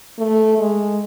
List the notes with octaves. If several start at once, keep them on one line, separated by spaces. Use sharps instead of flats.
A3
G#3